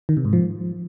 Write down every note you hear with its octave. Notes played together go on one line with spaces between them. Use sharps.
D#3
C3
G#2
F3